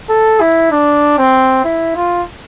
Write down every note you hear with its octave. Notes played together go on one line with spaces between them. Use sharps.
A4
E4
D4
C4
E4
F4